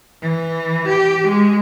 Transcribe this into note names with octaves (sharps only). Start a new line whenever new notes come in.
E3
G4
G#3